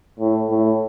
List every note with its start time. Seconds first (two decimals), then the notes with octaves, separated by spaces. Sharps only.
0.20 A2
0.49 A2